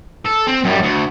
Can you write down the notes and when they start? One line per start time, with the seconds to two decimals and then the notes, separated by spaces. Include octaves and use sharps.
0.25 A4
0.47 C4
0.64 F#2 G3
0.82 D2